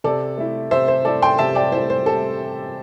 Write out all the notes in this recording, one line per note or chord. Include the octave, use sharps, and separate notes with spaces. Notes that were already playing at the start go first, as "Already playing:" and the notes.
C3 A4 D5
A3 E4
C3 C5 E5
C5
A3 E4 A4 D5
G5 C6
C3 E5 A5
D5 G5
A3 E4 C5
C5
C3 A4